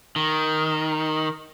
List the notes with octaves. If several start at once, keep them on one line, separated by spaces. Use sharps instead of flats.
D#3